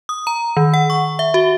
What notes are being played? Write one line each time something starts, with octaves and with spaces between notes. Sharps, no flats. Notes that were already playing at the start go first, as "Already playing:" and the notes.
D#6
A#5
D#3
F#5
C#6
E5
F#4